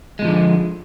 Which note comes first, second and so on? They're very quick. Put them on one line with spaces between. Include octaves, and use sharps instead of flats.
G#3 B2 F3 D3